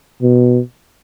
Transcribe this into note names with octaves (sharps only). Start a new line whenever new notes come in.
B2